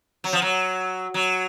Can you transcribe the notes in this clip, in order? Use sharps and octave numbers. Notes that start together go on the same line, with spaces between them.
F#3
F3
F#3
F#3